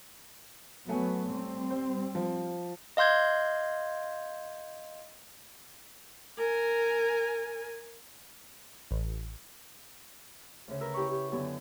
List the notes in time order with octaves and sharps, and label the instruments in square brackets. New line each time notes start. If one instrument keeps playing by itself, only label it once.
[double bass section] F#3 B3 [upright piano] A3 C#5 G#5
[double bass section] G3 C4
[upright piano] C5
F3
[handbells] D#5 F5 C6 G6 G#6
[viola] A#4 G#5
[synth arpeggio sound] A1
[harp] D2 C#3
A#4 B4 E6
C#4 E4 G4 G5 B5 C#6
G4
F#2 D3 B3 G4 G#5